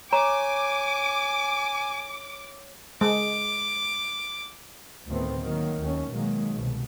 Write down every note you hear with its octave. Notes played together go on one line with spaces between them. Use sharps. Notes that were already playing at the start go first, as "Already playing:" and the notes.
C#5 G#5 A#5 D6
G#3 D6
D2 A2 D#3 A3 B3 C4
D#3 F#3 A#3
D#2 A3 C#4
B2 D#3 F#3 G#3 A#3
C2 B2